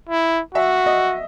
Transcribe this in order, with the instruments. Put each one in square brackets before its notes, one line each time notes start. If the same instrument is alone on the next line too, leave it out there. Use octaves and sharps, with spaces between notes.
[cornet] E4
[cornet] F#4 [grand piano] E5
[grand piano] D#5